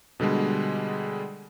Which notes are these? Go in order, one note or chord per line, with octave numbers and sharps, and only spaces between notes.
B2 D3 G3 G#3